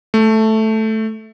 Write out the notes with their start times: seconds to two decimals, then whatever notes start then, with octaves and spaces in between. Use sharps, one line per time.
0.14 A3